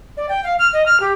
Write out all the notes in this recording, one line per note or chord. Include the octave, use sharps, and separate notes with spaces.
D5
G5
F5
F6
D#5
F6
G4